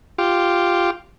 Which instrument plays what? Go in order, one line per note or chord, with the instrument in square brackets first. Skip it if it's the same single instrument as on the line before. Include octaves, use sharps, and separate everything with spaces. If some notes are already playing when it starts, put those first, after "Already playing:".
[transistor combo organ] F4 G4